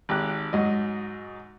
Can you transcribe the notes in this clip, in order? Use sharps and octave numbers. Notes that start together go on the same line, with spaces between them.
G#1 G4 F#6
G#2 F#3 D#5